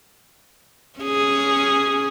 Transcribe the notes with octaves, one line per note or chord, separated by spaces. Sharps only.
C#4 G#4